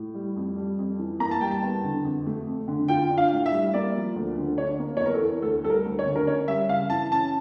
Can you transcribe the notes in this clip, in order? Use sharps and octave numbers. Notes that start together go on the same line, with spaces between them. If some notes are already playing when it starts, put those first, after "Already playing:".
Already playing: A2
G3
F2
G3
F2
E3
A#3 A#5
A5
G3 G5
A5
E2
D3
F2
A3
F2
D3
F4 G5
D4
F5
A2
E5
G3
A#3 D5
F3
D2
D3
D4 C#5
A#3
C#5
E2
A#4
A4
E3
D2 A4
G3 A4
A#4
D2
C#5
D3
A#4
C#4 C#5
G3 E5
C#3 F5
E3 A5
C#4 A5